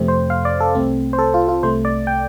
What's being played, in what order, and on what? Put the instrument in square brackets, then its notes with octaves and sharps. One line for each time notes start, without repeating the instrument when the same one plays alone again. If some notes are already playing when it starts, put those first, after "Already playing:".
Already playing: [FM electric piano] F2 C3 A3 C4
C5
F5
D5
A4
C2 C3 A3 C4
C5
A4
F4
F4
C2 C3 A3 C5
D5
G5